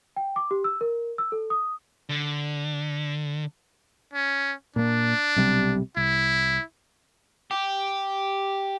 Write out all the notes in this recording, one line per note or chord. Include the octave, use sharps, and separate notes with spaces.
G5
D6
G4
E6
A#4
E6
A4
D#6
D3
C#4
A#2 A#3 D4
B1 C3 G3
C2 E4
G4